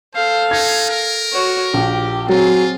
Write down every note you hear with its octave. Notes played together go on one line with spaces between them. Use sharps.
A4 C5 F5
D#4 G#6
A#4
F#4 C#5
A#1 G4
F#3 C4 F4 G#4